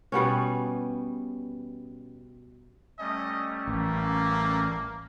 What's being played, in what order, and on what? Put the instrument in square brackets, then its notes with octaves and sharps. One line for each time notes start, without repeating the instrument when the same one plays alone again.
[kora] B2 G3 B3 C#4
[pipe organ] G3 A3 C#4 [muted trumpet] D#5
[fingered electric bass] A1 [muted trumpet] A#3